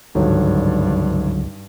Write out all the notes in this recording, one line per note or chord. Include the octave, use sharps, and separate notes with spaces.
G#1 C#2 G2 D3 F#3